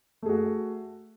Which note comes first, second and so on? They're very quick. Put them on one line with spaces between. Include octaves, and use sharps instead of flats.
A3 G#4 F#4